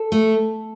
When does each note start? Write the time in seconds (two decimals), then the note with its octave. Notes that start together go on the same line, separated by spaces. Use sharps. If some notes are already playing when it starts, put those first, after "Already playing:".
Already playing: A4
0.12 A3